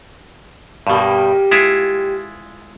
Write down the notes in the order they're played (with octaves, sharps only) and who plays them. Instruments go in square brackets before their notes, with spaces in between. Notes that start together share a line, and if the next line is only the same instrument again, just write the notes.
[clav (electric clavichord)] G2 B2 [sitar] G3 A#3 G4
[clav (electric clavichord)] G#3 E4 F4